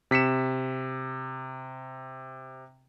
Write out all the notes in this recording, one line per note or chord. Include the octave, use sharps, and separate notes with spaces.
C3 B6 C#7 E7